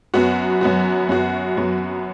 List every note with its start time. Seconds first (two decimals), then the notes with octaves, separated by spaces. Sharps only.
0.14 F#2 F#3 B3 F#4
0.61 F#2 F#3 B3 F#4
1.09 F#2 F#3 B3 F#4
1.57 F#2 F#3 B3 F#4